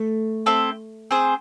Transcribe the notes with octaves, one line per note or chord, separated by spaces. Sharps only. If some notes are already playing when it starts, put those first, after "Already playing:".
Already playing: A3
C4 E4 A4
C4 G#4 C5